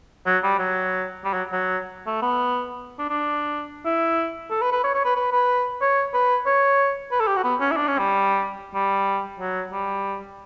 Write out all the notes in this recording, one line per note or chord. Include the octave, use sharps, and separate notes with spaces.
F#3
G3
F#3
G3
F#3
F#3
A3
B3
D4
D4
E4
A4
B4
B4
C#5
C#5
B4
B4
B4
C#5
B4
C#5
B4
A4
G4
F#4
B3
C#4
E4
D4
C#4
G3
G3
F#3
G3